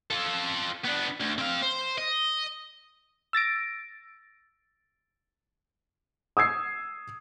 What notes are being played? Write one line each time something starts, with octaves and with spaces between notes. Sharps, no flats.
F4 A4
B3 D4
D2
C4 F5
C5
D#5
E6 A6 A#6 D7
D#6 E6 G#6 C7